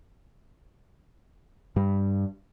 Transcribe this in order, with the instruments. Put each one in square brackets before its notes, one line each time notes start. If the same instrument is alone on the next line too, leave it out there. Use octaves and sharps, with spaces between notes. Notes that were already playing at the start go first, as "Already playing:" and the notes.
[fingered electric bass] G2 G3